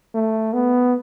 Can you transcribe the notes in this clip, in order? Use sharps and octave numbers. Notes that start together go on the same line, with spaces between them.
A3
B3